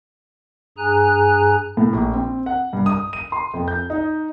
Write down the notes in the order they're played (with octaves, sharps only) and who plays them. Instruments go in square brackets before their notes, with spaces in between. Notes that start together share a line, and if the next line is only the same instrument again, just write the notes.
[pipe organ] G2 G#4 G#5 A#5 F#6
[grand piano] A2
A#1
C4
F#5
G2
D#6
D#7
C6
F2
G6
D#4